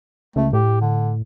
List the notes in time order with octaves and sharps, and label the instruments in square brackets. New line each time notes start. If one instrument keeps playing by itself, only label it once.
[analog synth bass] C#2 [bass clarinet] A3
[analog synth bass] A2 [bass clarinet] G4
[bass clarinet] D3